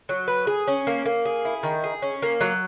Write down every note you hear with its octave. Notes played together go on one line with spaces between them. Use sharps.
F#3
B4
G#4
C#4
A#3
A#3
G#4
E4
D#3
G#4
C#4
A#3
F#3